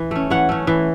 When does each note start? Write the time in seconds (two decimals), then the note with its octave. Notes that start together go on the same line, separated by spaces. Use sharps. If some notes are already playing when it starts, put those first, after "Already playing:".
Already playing: E3
0.11 A3 C#4
0.30 E3 C#5 F#5
0.49 A3 C#4
0.67 E3